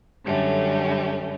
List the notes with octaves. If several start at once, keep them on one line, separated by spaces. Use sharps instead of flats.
F#2 D3 G3 A3 C#4